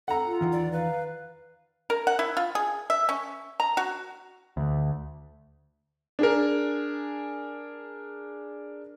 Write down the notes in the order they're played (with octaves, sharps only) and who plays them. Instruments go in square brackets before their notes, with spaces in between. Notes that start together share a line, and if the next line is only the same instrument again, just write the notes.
[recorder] A4 [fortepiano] F#5 A#5
[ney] F4
[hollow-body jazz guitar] E2 D#3 E3
[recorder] D5
[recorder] B4 [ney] F5
[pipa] A#4
F#5
E4
F4
G#4
E5
C#4
A#5
F#4
[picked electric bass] D2
[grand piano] D4 G#4 A#4